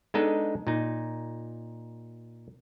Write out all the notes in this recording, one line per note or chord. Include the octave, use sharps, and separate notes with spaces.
G#3 B3 D4 D#4 A4 D#5
A#2 D#4